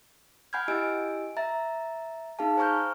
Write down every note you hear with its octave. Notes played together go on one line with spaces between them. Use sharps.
F#5 G#5 B5 F6 G6 G#6
E4 G4 D#5 G#5 E6 D7
E5 A#5 A6
D#4 G#4 F5 A5
C5 G#5 A#5 C#6 F6 G6